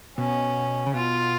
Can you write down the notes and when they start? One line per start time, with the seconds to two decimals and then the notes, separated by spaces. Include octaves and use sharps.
0.18 B2 C#4
0.86 C#3
0.94 B2 F4